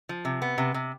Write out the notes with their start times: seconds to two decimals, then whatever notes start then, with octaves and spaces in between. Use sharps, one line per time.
0.09 F3
0.25 C3
0.42 B3
0.58 C3
0.74 C3